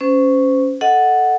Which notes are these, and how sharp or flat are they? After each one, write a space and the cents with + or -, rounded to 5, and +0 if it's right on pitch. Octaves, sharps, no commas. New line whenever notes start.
C#4 +0 C5 -30
A4 +0 D#5 +10 F#5 +0